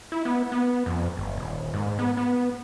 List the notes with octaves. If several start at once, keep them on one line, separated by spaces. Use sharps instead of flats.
E4
B3
B3
F2
G1
D#1
G#2
B3
B3